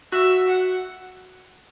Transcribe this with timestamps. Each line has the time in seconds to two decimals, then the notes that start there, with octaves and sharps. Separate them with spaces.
0.12 F#4 E5
0.48 F#5